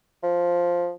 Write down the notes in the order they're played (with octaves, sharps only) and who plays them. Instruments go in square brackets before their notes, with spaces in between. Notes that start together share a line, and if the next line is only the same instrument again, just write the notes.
[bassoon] F3